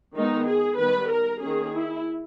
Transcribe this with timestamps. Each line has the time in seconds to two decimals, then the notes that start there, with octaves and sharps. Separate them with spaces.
0.16 D#3 G#3 B3 D#4
0.47 G#4
0.78 D#3 G3 B3 B4
1.10 A#4
1.41 D#3 A#3 C#4 G#4
1.72 E4